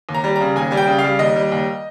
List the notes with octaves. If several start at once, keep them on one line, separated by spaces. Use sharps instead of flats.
D#2
A#5
G3
C#3 A#5
D#2 G#5
G3 G#5
G5
C#3
F5
G3
D#2 D#5
G3
D#2